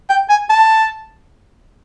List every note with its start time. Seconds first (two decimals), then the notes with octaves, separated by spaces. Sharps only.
0.10 G5
0.29 G#5
0.50 A5